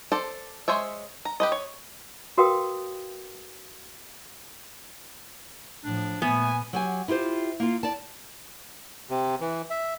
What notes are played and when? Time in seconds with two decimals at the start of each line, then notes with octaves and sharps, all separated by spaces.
0.12 A4 C5 D5
0.68 G#3 C5 C#5 E5
1.25 A#5
1.40 G4 B4 D#5
1.52 C#5
2.38 F#4 A#4 B4 F5 G5 D#6
5.84 A2 F3 D4
6.22 A#2 A3 B3 G#5
6.73 F#3 G4 G#5
7.08 E4 F4 G4 C5
7.60 A#3 F4
7.83 D5 A5
9.10 C3
9.41 E3
9.70 E5